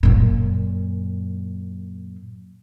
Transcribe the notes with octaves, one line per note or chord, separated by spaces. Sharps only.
F#2 A#2